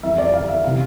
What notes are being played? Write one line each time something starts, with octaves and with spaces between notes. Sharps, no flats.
F2 E3 E5
D5
F5
E5
C3 E3 F5